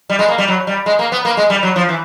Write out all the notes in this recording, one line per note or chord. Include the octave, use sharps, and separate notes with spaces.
G3
G#3
A#3
G3
F#3
G3
G#3
A#3
B3
A#3
G#3
G3
F#3
F3
E3